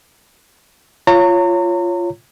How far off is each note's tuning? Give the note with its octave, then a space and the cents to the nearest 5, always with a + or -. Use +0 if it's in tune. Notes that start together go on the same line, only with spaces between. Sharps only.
F4 -10 C#5 +0 A#5 -35